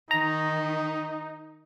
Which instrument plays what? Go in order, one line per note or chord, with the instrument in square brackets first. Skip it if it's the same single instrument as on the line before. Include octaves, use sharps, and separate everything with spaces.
[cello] D#3 [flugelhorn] D#4 [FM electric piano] A#5